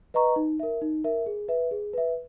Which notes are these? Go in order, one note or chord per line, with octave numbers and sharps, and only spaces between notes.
B4 D#5 A#5 C#6
D#4
A#4 E5
D#4
A#4 E5
G#4
B4 E5
G#4
B4 E5